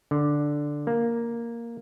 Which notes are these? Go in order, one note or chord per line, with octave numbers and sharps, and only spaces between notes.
D3
A#3